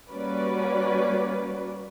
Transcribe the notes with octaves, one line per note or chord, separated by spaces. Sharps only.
G3 A#3 C#4 F#4 B4 D5